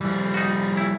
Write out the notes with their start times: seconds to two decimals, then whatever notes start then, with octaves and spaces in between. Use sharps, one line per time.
0.01 E3 F3 G3
0.34 D#4 F#4
0.77 E4